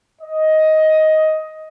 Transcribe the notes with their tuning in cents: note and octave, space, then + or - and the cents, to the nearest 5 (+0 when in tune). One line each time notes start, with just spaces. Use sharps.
D#5 +10